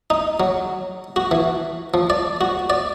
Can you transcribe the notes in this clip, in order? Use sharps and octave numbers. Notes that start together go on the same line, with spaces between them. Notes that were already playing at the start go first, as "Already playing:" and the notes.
D#4
F#3
F#4
E3
F3
D5
F#4
D5